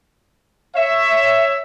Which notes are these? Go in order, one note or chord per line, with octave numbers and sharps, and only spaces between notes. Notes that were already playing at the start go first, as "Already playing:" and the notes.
C#5 E5